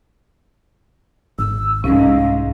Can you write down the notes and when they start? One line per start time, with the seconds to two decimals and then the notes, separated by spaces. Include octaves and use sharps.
1.39 G#1 E6
1.84 C2 G#2 C#4 F5